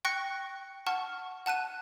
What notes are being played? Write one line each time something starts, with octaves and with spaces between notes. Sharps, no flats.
G5 C#6 F#6 A#6 C#7
F#5 A5 C#6 F6
F#5 A5 F#6 D#7